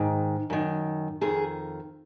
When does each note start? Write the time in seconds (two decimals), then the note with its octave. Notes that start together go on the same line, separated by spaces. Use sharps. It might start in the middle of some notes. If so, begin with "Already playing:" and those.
Already playing: G#2 D#3
0.50 F#2 D#3
1.21 F2 D#3 G#4